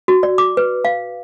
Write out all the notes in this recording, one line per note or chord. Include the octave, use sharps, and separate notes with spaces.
F#4
D5
D6
B4
F5